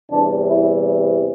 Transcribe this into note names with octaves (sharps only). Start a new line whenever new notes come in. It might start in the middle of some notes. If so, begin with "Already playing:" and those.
E2 C3 E3 G3 D4
E4